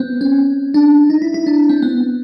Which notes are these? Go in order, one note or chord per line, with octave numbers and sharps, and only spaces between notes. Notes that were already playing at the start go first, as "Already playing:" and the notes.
Already playing: B3 C4
C#4
D4
D#4
E4
E4
D4
C4
B3